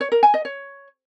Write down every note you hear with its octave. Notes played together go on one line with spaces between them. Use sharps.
C#5
A#4
G#5
D#5
C#5